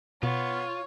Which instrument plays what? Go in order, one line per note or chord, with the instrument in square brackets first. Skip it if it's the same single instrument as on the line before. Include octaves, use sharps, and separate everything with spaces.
[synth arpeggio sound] B2 [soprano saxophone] B3 [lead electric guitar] F4 [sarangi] C#5